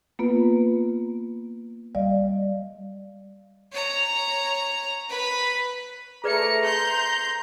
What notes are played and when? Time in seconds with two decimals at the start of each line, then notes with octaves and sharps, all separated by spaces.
0.19 A#3 B3 F4 B4
1.95 G3 D5 D#5 F5
3.72 C#5 A#5
5.09 B4 B5
6.24 A3 G#4 B4 D5 A#5 C#7
6.63 C6 G6